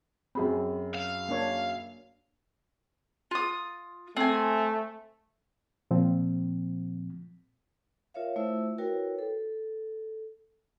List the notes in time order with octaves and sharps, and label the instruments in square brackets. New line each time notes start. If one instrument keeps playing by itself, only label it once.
[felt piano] F#2 G#4 B5 [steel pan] C4
[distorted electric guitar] F5
[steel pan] A#3 D4 C#5
[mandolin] F4 D#6
[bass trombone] A3 [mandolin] C4 G#5
[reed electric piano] A#2 F3 C4
[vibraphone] F4 A#4 C#5 E5 F5
A3 E4 F4 C5 E5 E6
E4 F#4 A#4 B4 C#5 G5
A4